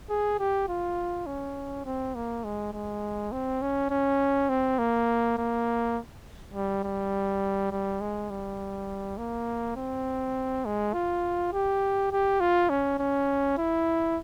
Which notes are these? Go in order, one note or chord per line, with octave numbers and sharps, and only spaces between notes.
G#4
G4
F4
C#4
C4
A#3
G#3
G#3
C4
C#4
C#4
C4
A#3
A#3
G3
G3
G3
G#3
G3
A#3
C4
G#3
F4
G4
G4
F4
C#4
C#4
E4